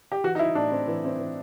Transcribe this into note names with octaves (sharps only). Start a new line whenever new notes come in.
G4
E3 F#4
D#4
E3 E4
A2 D4
C4
E3
C4
E3